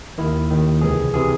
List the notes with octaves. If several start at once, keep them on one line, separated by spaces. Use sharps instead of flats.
D#2 D#3 E4
D#2 D#3
C#2 C3 E3 G#4
C3 E3 G#4